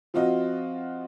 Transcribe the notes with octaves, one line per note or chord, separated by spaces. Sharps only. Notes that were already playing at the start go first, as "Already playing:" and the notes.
F3 C4 F4 F#4 D#5